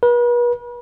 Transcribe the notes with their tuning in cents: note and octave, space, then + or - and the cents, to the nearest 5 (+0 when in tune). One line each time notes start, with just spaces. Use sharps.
B4 -40